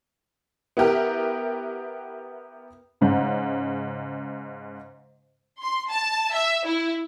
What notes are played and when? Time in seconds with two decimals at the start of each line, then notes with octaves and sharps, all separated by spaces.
0.77 B3 E4 G4 A#4
3.01 G#2 C#3
5.62 C6
5.90 A5
6.34 E5
6.65 E4